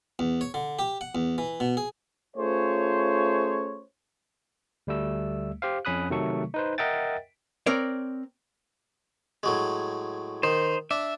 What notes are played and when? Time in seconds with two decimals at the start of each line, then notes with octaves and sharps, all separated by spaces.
0.19 E2
0.41 C#5
0.54 D3
0.79 G4
1.01 F#5
1.15 E2
1.38 E3
1.60 B2
1.77 G#4
2.36 A3 C#4 F4 G#4 C5 C#5
4.87 D2 G3 A3 E6
5.62 G4 C5 F5
5.85 F2 C#4 B5 D#6 F#6
6.10 C3 D#3 F#3 A3 A4 C#6
6.54 D#4 B4 C5
6.78 A#4 D#5 E5 F#5 G5 A6
7.66 C4 A#4 C#5 D5
9.43 A2 F#3 G#3
10.43 D#3 D#4 C5
10.91 D4 E5